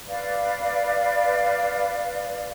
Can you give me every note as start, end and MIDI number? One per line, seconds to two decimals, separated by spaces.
0.08 2.51 71
0.08 2.51 74
0.08 2.51 77